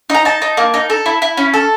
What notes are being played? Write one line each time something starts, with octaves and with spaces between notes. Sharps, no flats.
D#4 A#5
D#4 A5
D#4
A#3
D#4
A4
E4
E4
C#4
A4